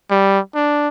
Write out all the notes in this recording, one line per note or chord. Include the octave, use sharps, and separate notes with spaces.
G3
D4